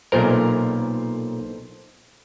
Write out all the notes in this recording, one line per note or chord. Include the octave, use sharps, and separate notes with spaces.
B1 A#2 A4 A#4 C5